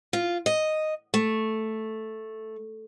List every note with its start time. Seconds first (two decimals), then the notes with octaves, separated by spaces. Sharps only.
0.13 F4
0.46 D#5
1.14 A3